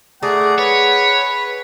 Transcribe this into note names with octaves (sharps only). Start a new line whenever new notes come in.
A3 G#4 D5 F#5 A#5
B4 C#5